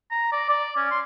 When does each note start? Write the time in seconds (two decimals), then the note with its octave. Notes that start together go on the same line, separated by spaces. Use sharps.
0.11 A#5
0.32 D5
0.49 D5
0.76 C#4
0.91 C6